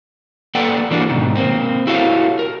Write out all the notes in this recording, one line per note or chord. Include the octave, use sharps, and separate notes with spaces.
A#3 A4 B4 D5 F#5 G5
E3 A#3 D4 F#4
G#2 B2 D#3
A#3 C4
E4 F#4 G4 A4 C#5 F5
A#4